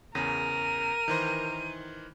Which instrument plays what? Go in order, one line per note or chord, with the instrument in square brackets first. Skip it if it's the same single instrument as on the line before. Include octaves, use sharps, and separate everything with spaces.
[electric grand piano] E2 C#3 A#6 [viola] A#4 [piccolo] D#7
[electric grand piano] D#3 E3 C5